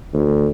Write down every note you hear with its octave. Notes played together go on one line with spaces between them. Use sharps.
D2